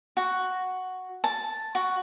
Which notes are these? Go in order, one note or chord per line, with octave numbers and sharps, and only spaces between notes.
F#4
A5
F#4